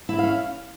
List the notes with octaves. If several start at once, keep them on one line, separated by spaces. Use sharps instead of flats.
C#4 E4 E5 F5